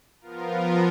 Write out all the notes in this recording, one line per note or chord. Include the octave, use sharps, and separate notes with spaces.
F3 B3 F4 A#4